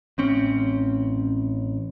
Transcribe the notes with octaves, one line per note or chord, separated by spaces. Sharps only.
A1 C4 C#4